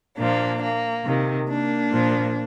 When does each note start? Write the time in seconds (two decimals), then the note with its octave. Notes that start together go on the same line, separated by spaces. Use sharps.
0.17 A#2 F3 A#3 D4
0.61 A#3
1.05 C3 D#3
1.48 A#3 D4
1.91 A#2 F3